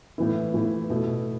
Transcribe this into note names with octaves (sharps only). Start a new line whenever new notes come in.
A2 E3 B3 E4
A2 E3 B3 E4
B2 A3 E4